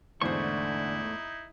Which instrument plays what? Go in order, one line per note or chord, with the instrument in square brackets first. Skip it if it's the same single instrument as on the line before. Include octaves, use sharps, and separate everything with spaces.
[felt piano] E2 G#2 C5 [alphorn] D3 [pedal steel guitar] A3 C#6 [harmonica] D#4 E4